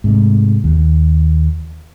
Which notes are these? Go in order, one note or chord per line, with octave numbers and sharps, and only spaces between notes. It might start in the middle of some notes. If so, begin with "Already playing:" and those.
G#2 C3 A3
D#2